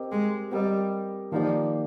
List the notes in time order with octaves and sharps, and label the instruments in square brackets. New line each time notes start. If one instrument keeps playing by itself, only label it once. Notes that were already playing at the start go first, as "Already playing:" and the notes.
Already playing: [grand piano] C4 G4 A#4 D#5
[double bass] G#3
[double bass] G3 [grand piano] C4 G4 A#4 D#5
[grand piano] D#3 A#3 D#4 G4 D5 [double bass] F3